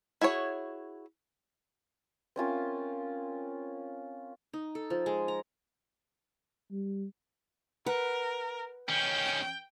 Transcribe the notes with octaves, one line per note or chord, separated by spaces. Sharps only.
E4 F#4 G#4 C#5
C4 C#4 F4 A#4
D#4
A4
F3
G#3
A#5
G3
A#4 B4 F#5
D#3 C#4 G5